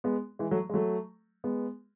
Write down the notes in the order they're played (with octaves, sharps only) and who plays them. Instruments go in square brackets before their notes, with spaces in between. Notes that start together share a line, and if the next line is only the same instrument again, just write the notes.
[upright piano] G#3 B3
E3 G#3
F#3 A3
G#3
F#3 A3
G#3 B3